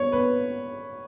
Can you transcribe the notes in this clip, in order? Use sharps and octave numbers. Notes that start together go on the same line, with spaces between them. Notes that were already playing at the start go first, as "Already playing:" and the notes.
Already playing: C#5
B4